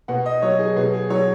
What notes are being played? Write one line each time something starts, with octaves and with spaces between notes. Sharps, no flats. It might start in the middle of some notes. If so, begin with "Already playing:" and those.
B2 F#5
D#5
F#3 C#5
G#4
B2 G#4
G#4
F#3 C#5